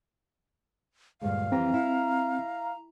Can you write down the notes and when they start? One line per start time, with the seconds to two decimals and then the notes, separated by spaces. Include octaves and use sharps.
1.21 D2 G2 A#2 G#3 F5
1.52 F2 E3 C4 G4 A#5
1.74 E4